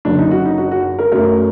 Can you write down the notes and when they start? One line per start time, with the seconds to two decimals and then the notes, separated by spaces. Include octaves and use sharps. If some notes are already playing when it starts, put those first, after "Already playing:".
0.05 F#1 F#2 D3 D4
0.19 D#4
0.31 F#4
0.45 D#4
0.58 F#4
0.72 F#4
0.99 A#4
1.12 F#2 F#3 A3 A#4